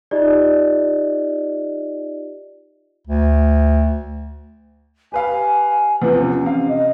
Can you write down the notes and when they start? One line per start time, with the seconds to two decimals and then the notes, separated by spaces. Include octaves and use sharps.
0.11 D#4 F4 G4 D5 D#5
3.07 D2
5.12 G4 B4 F5 G#5
6.02 E2 C3 F3 B4
6.18 C#4
6.43 C3 F5
6.68 D#5